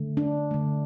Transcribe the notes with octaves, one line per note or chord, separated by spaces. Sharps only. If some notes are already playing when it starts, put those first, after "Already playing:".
Already playing: D3 A3
D4
D3 A3